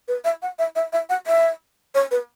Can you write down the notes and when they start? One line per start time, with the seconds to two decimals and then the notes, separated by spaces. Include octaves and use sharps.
0.08 B4
0.25 E5
0.42 F#5
0.59 E5
0.76 E5
0.93 E5
1.10 F#5
1.27 E5
1.95 C#5
2.11 B4